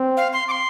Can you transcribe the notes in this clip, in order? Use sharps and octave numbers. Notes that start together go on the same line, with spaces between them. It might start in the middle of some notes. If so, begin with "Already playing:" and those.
Already playing: C4
F5
C6
D6
C6